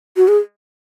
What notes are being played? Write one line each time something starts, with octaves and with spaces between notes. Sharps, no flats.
F#4
G#4